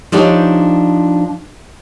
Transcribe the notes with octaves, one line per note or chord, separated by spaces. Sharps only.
F3 D4 D#4 G4 C#5